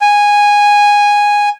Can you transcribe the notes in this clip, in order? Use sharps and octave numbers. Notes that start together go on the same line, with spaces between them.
G#5